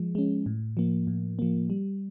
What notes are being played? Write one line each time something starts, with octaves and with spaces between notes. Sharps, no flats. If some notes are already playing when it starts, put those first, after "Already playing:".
Already playing: F3 G#3
G#3 C#4
A2
F3 A#3
A2
F3 A#3
G3